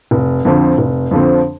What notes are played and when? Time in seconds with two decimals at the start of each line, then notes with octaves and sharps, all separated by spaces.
0.11 F1
0.45 F2 D3 F3 C4
0.78 F1
1.11 F2 D3 F3 C4